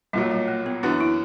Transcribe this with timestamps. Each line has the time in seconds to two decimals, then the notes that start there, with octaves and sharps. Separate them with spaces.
0.13 B1 A#2 F#3 G3
0.31 G3
0.48 A#3
0.66 B3
0.83 F#2 E3 B3 D4 F#4
1.01 E4